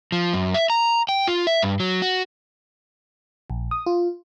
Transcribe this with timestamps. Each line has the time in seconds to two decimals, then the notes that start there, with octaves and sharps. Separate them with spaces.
0.12 F3
0.33 F#2
0.54 E5
0.70 A#5
1.09 G5
1.27 F4
1.47 E5
1.62 G2
1.80 F#3
2.02 F#4
3.50 A#1
3.71 D#6
3.86 F4